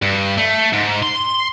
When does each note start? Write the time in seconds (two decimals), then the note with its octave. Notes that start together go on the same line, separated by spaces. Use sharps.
0.02 G2
0.37 A3
0.73 G#2
1.03 C6